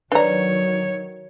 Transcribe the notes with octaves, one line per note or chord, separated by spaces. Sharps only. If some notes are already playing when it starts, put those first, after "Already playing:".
D#3 F#3 D4 B4 C#5 D5 A#5